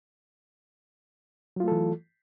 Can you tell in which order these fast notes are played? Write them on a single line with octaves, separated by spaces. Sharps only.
F#3 F4 A3 A4 E3